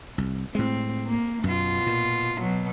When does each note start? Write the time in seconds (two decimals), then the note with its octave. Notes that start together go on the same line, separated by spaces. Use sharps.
0.18 C2
0.55 A2 G#3 C4
1.07 A#3
1.44 F#2 B2 F4
1.87 A#2
2.40 B2 F#3